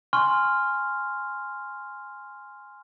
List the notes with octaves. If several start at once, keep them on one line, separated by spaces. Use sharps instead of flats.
G#5 C6 C#6 F6